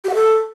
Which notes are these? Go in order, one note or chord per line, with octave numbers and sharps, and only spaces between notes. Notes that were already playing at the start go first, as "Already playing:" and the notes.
G4
F#5
A4